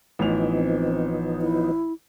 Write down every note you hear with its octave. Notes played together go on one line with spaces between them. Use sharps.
A1 E3 F3 B3 D#4 F7
C4
E4